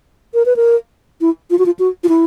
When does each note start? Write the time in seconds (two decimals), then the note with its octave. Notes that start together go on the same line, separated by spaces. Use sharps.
0.34 A#4
0.46 B4
0.56 A#4
1.21 E4
1.50 F4
1.59 F#4
1.66 F4
1.79 F#4
2.04 F4
2.09 E4